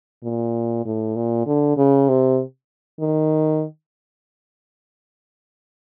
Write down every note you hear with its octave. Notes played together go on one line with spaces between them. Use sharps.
A#2
A2
A#2
D3
C#3
C3
D#3